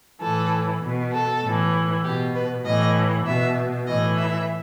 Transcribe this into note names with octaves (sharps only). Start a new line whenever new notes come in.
A2 E3 A4
B2
A4
A2
E3
B2 G4
B4
A2 E3 D#5
B2 E5
A2 E3 D#5
E5